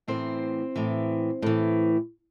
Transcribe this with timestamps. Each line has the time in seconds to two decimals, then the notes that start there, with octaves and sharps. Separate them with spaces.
0.08 A2 E3 C4 C5
0.76 A2 E3
1.42 A2 E3